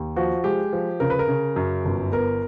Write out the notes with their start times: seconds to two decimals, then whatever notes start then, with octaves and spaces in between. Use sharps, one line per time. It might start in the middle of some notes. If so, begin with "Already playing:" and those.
Already playing: D#2
0.16 F3 F#4
0.44 G#3 G4
0.73 F3
1.00 C#3 A#4
1.10 B4
1.19 A#4
1.28 C#3
1.56 F#2
1.85 G1
2.13 B3 A#4